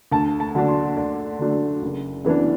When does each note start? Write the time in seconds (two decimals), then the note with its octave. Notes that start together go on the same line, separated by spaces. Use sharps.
0.11 D2 A5
0.40 A5
0.55 D3 F#3 A3 D4
0.68 C6
0.97 D2 D5
1.39 D3 F#3 A3 D4
1.82 F#1
2.25 F#2 E3 B3 D4